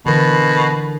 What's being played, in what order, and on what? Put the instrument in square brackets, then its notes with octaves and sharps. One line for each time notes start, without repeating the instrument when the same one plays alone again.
[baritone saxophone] B2 [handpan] D3 E3 A#4